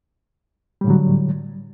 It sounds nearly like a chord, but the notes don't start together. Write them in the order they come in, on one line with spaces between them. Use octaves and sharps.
G3 A2 D3 F#3